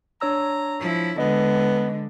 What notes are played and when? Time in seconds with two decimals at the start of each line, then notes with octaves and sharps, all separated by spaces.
0.21 D4 C#5 A#5 E6
0.80 F3 E4
1.18 D3 G#3 B3 D#5